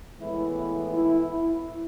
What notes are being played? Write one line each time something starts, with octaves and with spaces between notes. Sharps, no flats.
A2 E3 G#3 B3 E4
E4
E4
E4